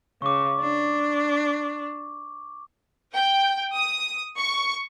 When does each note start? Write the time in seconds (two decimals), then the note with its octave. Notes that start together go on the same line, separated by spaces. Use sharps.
0.22 C#3 C#6 D6
0.61 D4
3.15 G5
3.74 D#6
4.37 C#6